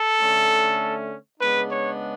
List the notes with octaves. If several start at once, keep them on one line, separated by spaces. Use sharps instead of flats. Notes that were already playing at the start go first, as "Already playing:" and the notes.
Already playing: A4
D3 A3 C#4
C#3 G#3 B3 D4 B4
C#5